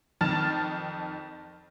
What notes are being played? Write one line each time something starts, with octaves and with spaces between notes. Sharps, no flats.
F2 D#3 A5 F6 A6